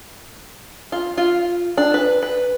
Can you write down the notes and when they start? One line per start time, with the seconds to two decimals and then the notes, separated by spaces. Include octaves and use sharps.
0.92 F4
1.18 F4
1.77 D4
1.94 B4
2.22 B4